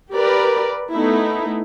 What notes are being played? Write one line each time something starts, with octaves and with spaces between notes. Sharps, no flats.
G4 A#4 B4 D5
A3 B3 D#4 E4